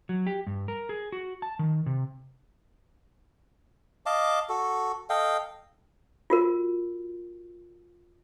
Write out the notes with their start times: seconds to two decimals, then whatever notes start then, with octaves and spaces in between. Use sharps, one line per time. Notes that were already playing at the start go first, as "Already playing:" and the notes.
0.09 F#3
0.27 G4
0.47 G2
0.68 A#4
0.89 G#4
1.12 F#4
1.42 A5
1.59 D#3
1.86 C3
4.06 D#5 F5 A5 D6
4.49 F#4 A4
5.10 A4 D#5 F5 G5
6.30 F4 F#4 A#4